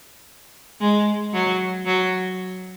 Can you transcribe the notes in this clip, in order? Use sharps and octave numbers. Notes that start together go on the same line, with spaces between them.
G#3
F#3
F#3